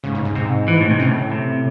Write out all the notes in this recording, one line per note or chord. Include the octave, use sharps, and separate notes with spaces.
G#2 C#3
G#2
G#2
G#2 C3
E3
A2
C3
A2 C#3
C3